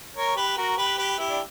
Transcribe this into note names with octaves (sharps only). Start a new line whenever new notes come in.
A#4 C#5
G4 B4
F#4 A#4
G4 B4
G4 B4
E4 G4
D4